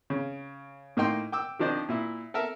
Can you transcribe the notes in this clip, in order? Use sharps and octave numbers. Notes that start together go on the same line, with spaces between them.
C#3
A2 A#3 D#4 G5 C6
G5 D6 E6
D#3 F3 D4 D#4 C5
A#2 E4
A4 A#4 E5